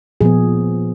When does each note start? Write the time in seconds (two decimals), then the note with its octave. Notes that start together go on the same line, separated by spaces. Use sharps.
0.21 A#2 F3 B3 G#4